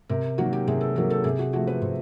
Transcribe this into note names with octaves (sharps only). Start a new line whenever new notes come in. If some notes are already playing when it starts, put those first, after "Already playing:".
C3 A#4
D#3 F#3 A#3 F#4
G4
C3 G#4
A4
D#3 F#3 A#3 A#4
A4
C3 G#4
F#4
F3 A3 F#4
B4
C3 C5